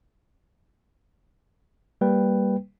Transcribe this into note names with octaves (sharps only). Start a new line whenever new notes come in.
G3 A#3 B4 G5